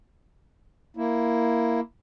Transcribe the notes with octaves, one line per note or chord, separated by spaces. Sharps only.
A#3 E4